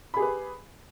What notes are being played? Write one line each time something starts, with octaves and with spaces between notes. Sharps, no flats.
G4 G#4 B4 B5